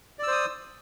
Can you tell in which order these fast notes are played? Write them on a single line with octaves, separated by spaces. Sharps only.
D5 E6 C5 D#6